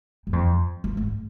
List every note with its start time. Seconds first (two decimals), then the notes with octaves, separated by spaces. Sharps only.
0.27 G2
0.33 F2
0.84 G2
0.97 G#2